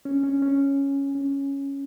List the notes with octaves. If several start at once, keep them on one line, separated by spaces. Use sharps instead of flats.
C#4
C#4
C#4
C#4